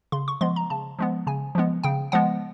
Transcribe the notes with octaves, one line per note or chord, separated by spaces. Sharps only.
C#3 C6
C#6
F3 G#3 B3 C6
A#5
C#3 A5
F3 G#3 B3
C#3 G#5
F3 G#3 B3
C#3 G5
F3 G#3 B3 F#5